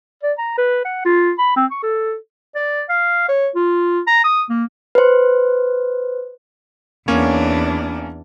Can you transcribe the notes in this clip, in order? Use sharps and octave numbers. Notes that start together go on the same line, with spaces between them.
D5
A#5
B4
F#5
F4
B5
C4
C#6
A4
D5
F5
C#5
F4
A#5
D#6
A#3
B4 C5
E2 A#3 C#4 D4 C#5